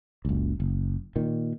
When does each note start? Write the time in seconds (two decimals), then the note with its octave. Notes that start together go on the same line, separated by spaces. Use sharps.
0.25 F#1 C#2
0.60 F#1
1.16 A#2 D#3